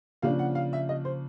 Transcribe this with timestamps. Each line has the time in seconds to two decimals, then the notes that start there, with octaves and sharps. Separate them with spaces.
0.22 C#3 F3 A#3 D4 F5
0.39 F#5
0.55 F5
0.73 E5
0.89 D#5
1.05 C5